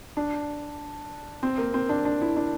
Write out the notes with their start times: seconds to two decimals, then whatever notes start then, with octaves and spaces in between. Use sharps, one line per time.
0.17 D4
1.43 C4
1.58 A#3
1.74 C4
1.89 D4
2.05 D4
2.21 E4
2.36 D4